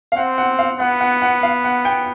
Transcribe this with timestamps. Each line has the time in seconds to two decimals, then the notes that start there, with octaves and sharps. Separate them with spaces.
0.12 F5
0.16 C4 F#5
0.38 F#5
0.59 F5
0.80 B3 F#5
1.01 F#5
1.22 F#5
1.43 F5
1.64 F#5
1.85 G5